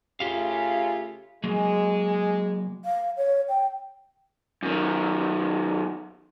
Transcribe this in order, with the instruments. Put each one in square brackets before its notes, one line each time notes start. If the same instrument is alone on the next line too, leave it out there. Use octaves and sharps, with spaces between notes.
[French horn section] C#3 A3 F4 [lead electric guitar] G4 F5
[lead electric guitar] F#3 A#3 [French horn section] G#3
[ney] F5
C#5
G5
[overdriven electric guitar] F#2 D#3